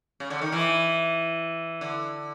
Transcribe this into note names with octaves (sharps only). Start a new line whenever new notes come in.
C#3
D3
D#3
E3
D3